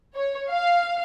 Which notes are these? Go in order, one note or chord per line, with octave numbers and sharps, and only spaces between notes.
C#5
F5